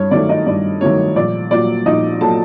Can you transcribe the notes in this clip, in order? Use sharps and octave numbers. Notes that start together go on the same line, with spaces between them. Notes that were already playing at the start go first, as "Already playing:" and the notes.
Already playing: G2 C#5
D#3 F#3 A3 D5
D#4 D#5
G2 D5
D#3 F#3 A3 C#5
A#1 D5
A#2 F#3 D5
A#1 D#4 D#5
A#2 F#3 A4 A5